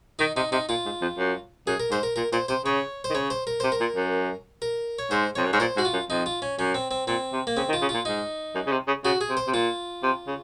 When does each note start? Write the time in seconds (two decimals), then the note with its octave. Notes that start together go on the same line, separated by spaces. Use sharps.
0.19 D#3 D#4
0.36 C3 D#4
0.52 C3 D#4
0.69 A#2 F4
0.85 G#2
1.01 F2
1.18 F#2
1.67 F#2 G#4
1.80 A#4
1.91 G#2 C5
2.03 A#4
2.16 A#2 A#4
2.32 A#2 C5
2.48 C3 C5
2.65 C#3 C#5
3.04 C5
3.10 D#3
3.14 C#3 C#5
3.30 C5
3.47 A#4
3.60 C3 C5
3.72 A#4
3.80 A#2
3.96 F#2
4.62 A#4
4.99 C#5
5.11 G#2 C5
5.35 F2 C#5
5.45 F#2
5.53 G#2 C#5
5.60 A#2 C5
5.76 G#2 F#4
5.85 F4
5.93 F#2
6.09 F2 D#4
6.26 F4
6.42 C#4
6.59 F#2 C#4
6.75 C4
6.91 C4
7.07 A#2 C4
7.32 C3
7.47 A#3
7.57 C#3 C4
7.69 D#3
7.73 F4
7.82 C#3
7.89 A#2 F4
8.05 G#2 D#4
8.55 F#2
8.66 C#3
8.72 C3
8.87 C#3
9.04 C#3 F#4
9.21 G#4
9.29 C3
9.37 C5
9.47 C3
9.53 A#2 F4
10.03 C3
10.27 C#3